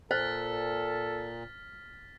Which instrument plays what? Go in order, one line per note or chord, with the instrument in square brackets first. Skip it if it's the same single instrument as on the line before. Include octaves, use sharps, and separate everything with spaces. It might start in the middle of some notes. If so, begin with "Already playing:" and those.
[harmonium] A#2 [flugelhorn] A4 [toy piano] C5 [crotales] F6 A6 B6